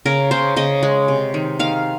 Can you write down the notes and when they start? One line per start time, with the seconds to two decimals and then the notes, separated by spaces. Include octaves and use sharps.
0.05 C#3 A#4
0.31 C#3 C5
0.56 C#3 D#5
0.83 G#3
1.08 C3
1.34 D#3
1.59 D#3 F5